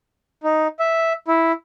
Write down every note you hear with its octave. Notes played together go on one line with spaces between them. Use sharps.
D#4
E5
E4